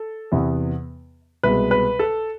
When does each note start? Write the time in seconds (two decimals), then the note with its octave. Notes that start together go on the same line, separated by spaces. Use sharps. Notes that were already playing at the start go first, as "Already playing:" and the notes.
Already playing: A4
0.32 E2 C3 E3 B3
1.43 C2 B2 G#3 B4
1.71 B4
1.99 A4